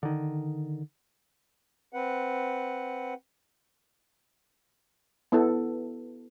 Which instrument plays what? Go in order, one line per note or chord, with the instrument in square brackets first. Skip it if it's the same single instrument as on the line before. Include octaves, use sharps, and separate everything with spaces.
[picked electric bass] D3 D#3
[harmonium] C4 B4 F#5
[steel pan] B3 E4 A4